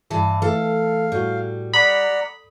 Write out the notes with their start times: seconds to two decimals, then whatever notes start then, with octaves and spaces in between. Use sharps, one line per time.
0.10 G2 E3 A5
0.42 E3 A3 A4 F5
1.12 A2 G3 F#4
1.73 D5 F#5 A#5 B5 D#6